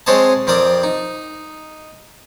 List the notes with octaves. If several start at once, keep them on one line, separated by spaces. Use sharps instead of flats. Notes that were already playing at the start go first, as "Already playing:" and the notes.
G#3 C4 C5 C#5 D#5 A5
F2 C4 A#4 D5 D#6
D#4